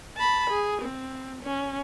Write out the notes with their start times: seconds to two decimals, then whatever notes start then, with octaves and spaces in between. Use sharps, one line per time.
0.17 A5 B5
0.50 G#4
0.82 C4
1.43 C#4